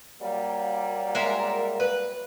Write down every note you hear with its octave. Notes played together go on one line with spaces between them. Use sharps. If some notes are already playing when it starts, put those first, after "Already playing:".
F#3 G3 A#3
G#3 A#4 E5
B4